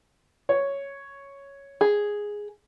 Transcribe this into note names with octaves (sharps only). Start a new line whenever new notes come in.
C#5
G#4